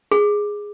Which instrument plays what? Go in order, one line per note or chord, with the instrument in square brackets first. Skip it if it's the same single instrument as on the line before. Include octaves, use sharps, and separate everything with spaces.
[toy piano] G#4